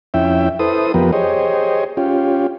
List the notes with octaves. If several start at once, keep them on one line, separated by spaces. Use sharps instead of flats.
F2 C#4 E4 E5 G5
E4 A4 B4 C5 D#6
F2 F3 B3 G4 A#4 B4
G4 G#4 C5 C#5 D#5
C#4 F4 G4